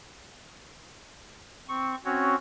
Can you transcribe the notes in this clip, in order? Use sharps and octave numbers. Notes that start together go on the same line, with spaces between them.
C4 C#6
C4 C#4 F#4 C#5